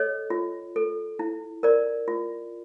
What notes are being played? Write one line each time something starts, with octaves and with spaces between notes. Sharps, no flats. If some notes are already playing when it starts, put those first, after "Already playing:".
Already playing: A4 C#5 D#5
F4
A4
E4
A#4 D5
F4